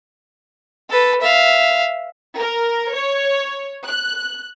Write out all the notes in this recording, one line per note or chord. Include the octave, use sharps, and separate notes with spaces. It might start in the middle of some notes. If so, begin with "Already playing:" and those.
A4 B4
E5 F5
A#4
C#5
F#6